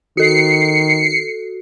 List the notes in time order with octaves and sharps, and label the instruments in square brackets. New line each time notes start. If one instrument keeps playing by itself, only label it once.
[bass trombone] D#3 [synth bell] F#4 A4 [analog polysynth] C7 C#7